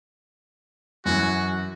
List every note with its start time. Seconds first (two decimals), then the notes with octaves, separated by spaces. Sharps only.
1.05 F#2 E3 F#4